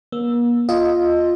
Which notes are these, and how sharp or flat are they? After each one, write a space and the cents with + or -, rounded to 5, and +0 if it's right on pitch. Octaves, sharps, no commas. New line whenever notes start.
A#3 +40 E6 +0
F4 +0 D#5 +0